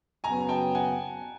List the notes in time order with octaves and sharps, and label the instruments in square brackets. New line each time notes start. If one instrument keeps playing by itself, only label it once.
[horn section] F#2 C#3 F#3 B3 [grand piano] G#5 A#5
[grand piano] G5 A5
F#5 G#5